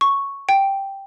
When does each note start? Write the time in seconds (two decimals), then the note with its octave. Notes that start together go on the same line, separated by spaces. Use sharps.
0.01 C#6
0.49 G5